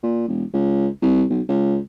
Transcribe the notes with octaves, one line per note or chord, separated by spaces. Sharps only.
A#2
E1
C#2
C2
B1
C#2